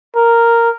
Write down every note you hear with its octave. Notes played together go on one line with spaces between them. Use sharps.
A#4